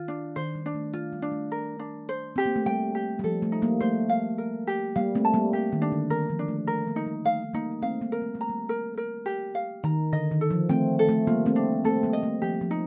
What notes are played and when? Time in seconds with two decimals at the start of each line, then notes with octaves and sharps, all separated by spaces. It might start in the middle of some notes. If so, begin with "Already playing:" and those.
Already playing: D#3 F4
0.08 D4
0.36 D#3 C5
0.55 G3
0.66 D4
0.74 A3
0.93 A3 F4
1.13 G3
1.22 D4
1.32 A3
1.52 A#4
1.79 D4
2.09 C5
2.36 C4 G4
2.45 A#3
2.56 A3
2.66 G3 G5
2.95 G4
3.19 G3
3.24 F3 A4
3.42 A3
3.52 D#4
3.62 G3 A#3
3.80 A3 C5
4.09 F5
4.38 A#4
4.67 G4
4.96 G3 A#3 F5
5.15 A3 C4
5.25 A5
5.34 G3 A#3
5.53 G3 G4
5.72 D#3
5.82 D4
5.92 D3
6.10 D#3 A#4
6.30 F3
6.39 D4
6.48 A3
6.67 A3 A#4
6.87 G3 A#3
6.96 D#4
7.06 G3
7.25 A3 F5
7.53 G3 A#3 D#4
7.82 A3 C4 F5
8.01 G3 A#3
8.12 A#4
8.21 G3
8.35 A3
8.41 A#5
8.49 G3
8.69 A#4
8.97 A#4
9.26 G4
9.55 F5
9.84 D#3 A#5
10.13 D3 D#5
10.31 D#3
10.41 A4
10.51 F3
10.69 A3 C4 G5
10.99 A4
11.09 A3
11.27 G3 A#3 F4
11.46 A3 C4
11.56 D4
11.85 A3 C4 A4
12.03 G3 A#3
12.13 D#5
12.23 A3
12.42 F3 G4
12.61 F3
12.71 D#4